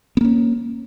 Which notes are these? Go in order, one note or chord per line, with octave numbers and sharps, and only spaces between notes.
A#3 B3 C#4